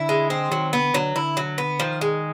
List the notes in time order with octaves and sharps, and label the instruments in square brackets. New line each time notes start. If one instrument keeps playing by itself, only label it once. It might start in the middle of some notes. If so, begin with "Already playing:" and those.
Already playing: [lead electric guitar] D3 [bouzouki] E4
[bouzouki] G#3
C4
[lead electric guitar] D#3 [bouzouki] F#3
[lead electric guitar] D3 [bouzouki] B3
[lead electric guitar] D3 [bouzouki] F#3
[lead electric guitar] D3 [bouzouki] E4
[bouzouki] F#3
B3
[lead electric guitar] D#3 [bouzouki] F3
[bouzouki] G#3